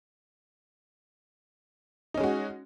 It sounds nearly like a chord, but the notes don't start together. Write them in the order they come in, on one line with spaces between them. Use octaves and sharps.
D#4 C#4 G#3 F#4